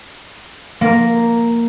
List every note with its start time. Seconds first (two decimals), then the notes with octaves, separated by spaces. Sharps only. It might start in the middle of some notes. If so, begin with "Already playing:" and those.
0.81 A#3